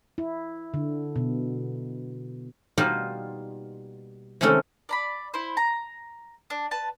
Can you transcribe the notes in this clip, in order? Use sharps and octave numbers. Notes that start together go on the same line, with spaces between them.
E4
D3
B2
B2 G3 A#3 D#4 F4
C3 D#3 G#3 A3 C#4 A4
D5 A#5 B5
E4 C5
A#5
D4
B4 A5